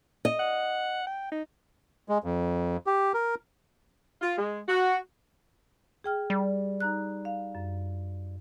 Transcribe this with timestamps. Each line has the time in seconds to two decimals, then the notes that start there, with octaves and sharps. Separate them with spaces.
0.25 D#5
0.39 F#5
1.07 G5
1.32 D#4
2.09 G#3
2.24 F2
2.87 G4
3.14 A#4
4.22 F4
4.38 G#3
4.68 F#4
6.04 G#4 G5 F6
6.30 G3
6.80 D#4 A#5 F#6
7.25 F5
7.55 F#2